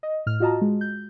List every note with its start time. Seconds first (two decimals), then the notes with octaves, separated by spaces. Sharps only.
0.03 D#5
0.26 A2 F6
0.40 F4 F#4 D#5 A5 A#5
0.61 G#3
0.81 G6